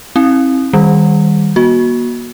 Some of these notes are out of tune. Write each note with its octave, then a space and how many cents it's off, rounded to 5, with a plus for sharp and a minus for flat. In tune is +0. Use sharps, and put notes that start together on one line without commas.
C4 +30 E4 -30
D#3 +15 G3 +15
A#3 +45 F#4 -10